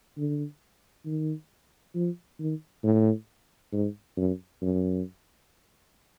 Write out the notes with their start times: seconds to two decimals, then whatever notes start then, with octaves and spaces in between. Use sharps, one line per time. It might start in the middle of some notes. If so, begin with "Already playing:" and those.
0.18 D3
1.06 D#3
1.95 F3
2.40 D#3
2.84 A2
3.72 G#2
4.17 F#2
4.62 F#2